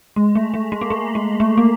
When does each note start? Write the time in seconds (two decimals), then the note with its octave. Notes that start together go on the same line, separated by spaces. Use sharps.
0.16 G#3
0.35 A3
0.54 A3
0.72 G#3
0.81 A#3
0.90 A3
1.15 G#3
1.40 A3
1.58 A#3